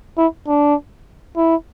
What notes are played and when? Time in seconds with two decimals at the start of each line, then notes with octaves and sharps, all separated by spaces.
0.18 E4
0.48 D4
1.37 E4